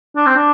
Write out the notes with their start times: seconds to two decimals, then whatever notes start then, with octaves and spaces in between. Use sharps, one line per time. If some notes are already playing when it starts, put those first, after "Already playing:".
0.17 D4
0.27 C4
0.37 D4